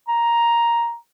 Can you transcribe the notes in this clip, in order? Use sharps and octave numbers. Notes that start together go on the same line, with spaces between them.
A#5